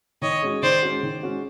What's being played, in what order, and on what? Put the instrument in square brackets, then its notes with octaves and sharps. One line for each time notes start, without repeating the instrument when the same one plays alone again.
[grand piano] D#3 [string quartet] C#5 D#5
[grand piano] G#3 C#4 F#4
[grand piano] D#3 [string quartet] C5 D5
[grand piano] G#3 C#4 F#4
D#3
G#3 C#4 F#4